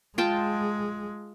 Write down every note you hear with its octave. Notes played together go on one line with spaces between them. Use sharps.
G#3 F4 G5 A5